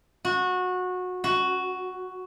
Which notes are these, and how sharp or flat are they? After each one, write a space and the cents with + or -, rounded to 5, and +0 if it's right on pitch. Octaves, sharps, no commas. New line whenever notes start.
F#4 -20
F#4 +5